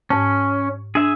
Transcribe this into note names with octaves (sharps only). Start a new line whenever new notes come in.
G#2 C#4 A5
D4 G#4 E5